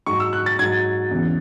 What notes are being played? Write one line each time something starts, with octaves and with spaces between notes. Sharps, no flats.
G#2 F#3 C#6
E6
F#6
A6
G#2 F#3 G#6
E2 C#3 E3